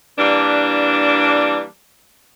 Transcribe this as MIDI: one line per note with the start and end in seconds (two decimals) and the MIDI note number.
0.18 1.63 52
0.18 1.63 55
0.18 1.63 58
0.18 1.63 62